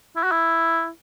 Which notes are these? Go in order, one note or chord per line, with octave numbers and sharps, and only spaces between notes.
E4
F#4
E4